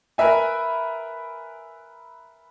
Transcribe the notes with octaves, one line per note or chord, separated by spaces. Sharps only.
A#4 B4 E5 G#5